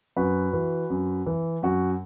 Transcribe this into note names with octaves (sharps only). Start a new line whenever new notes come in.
F#2 F#4 B4
E3
F#2
E3
F#2 F#4